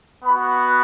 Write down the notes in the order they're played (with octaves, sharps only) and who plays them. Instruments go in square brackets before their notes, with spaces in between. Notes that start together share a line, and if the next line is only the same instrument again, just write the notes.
[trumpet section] B3 F#4 B5